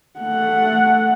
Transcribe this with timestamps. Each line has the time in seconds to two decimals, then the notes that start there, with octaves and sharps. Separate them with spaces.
0.20 A3 F#5